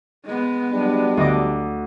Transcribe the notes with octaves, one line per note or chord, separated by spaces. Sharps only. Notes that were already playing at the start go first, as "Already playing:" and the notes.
G#3 B3
F#3 G3 D4
D2 D#5 D6